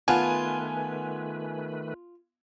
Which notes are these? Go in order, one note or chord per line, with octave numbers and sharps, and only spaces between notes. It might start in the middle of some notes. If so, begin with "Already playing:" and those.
D#3 A3 B3 F4 B4 F#5 G#5 A5